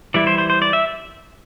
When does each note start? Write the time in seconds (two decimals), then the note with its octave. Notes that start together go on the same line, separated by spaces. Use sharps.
0.14 E3 G3 E4 D5
0.27 C5
0.38 C5
0.50 C5
0.62 D5
0.73 E5